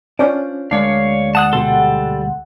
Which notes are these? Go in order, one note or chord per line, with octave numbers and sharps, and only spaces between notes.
C#4 D4 F4 C5 D5
D2 G#3 A#3 D4 C#5 D5 F5
F#5 A5 D#6 F#6
B2 G3 A4 C6